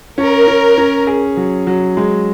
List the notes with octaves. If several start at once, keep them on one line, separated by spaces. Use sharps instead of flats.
C#4 A#4
C#4
C#4
G#4
F#3
F#3
G#3